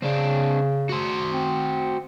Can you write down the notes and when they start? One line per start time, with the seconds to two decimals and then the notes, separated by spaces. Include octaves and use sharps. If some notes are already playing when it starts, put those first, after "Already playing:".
0.03 C#3 C4 D4
0.89 F#4 C5
1.32 C4